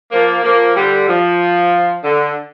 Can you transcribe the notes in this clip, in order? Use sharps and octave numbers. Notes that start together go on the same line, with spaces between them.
F3 A#3
F3 A#3
D3 G3
F3
D3